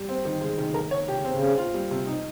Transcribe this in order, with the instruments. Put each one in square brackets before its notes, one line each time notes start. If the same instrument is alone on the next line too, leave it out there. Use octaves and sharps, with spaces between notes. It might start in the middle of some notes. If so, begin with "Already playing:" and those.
Already playing: [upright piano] G3
C4
D#3
[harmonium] C#3 [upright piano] G#3
[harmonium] C3 [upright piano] D#3
[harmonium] C#3
[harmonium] C3 [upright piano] A#4
[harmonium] C#3 [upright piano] C#5
[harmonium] C3 [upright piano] G4
[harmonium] C#3
[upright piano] C4
[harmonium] C#3
[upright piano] C4
F4
G3
C3
[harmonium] C3 [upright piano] D#4